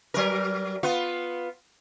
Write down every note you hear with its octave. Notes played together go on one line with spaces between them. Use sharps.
F#3 A#4
B3 F4